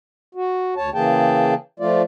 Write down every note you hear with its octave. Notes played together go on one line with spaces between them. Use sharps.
F#4
D2 C#5 A5
C#3 E3 A#3 G#4 G5 A5
F3 A3 F4 D5